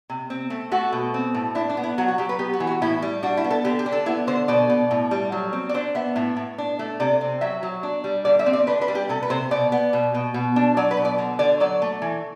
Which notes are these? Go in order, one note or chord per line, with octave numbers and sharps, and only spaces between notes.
C3
C4
A3
A3 F#4
B2
C4
A2
D4 E4
D4
B3
E4
F#3 F#4
F#4
F#3 G4
B4
B3 G4
F#4
E3
F#4
A2 E4
G3
D4 F#4
E4
B3
A4
D3 G4
G4
D4
A4
B3 E4
D3 C5
B2 D5
B2
A2
G3
F#3
C4
D5
D4 C5
B3 E5
A2 E5
A2
D4
A3
C3 D5
C4
F#3 E5
F#3
D4
G3
D3 D5
E5
C4
D5
D4 B4
B4
G3
G4
C3 A4
B4
C3 C5
B2 D5
B3
B2
B2
B2
D4
F#3 D5
B4
B2
D5
D3
D3 D5
F#3 D5
A3
E3